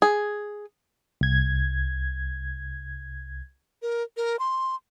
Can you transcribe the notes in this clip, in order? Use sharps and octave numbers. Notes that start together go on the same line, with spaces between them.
G#4
C2 G#6
A#4
A#4
C6